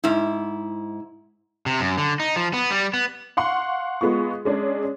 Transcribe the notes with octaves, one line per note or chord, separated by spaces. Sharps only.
G#2 E4
C3
F#2
D3
D#4
F3
B3
G3
B3
F5 F#5 C6 C#6 C#7
G#3 B3 F4 C#6
G#3 C#4 D4